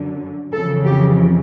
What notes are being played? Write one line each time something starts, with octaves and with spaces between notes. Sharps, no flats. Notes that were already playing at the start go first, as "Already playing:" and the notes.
Already playing: F#2 D3
F2 C#3 E3 A4
G4